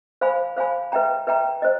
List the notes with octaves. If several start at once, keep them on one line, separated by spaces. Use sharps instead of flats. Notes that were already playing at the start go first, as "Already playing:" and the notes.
C5 F5 G#5 B5
C5 F5 G#5 B5
B4 E5 G5 A#5
B4 E5 G5 A#5
C5 D#5